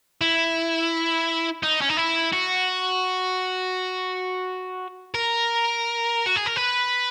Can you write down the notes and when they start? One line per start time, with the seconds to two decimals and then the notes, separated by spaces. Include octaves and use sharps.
0.21 E4
1.63 D#4
1.82 C#4
1.89 D#4
1.97 E4
2.33 F#4
5.15 A#4
6.27 F#4
6.36 G#4
6.47 A#4
6.57 B4